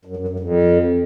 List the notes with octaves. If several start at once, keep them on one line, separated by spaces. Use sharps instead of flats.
F#2
F#2
F#2
F2